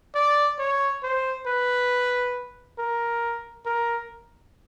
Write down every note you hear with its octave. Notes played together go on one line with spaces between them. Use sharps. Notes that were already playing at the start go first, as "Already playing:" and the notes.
D5
C#5
C5
B4
A#4
A#4